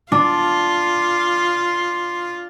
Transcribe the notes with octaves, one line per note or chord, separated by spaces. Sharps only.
D4 F4 C6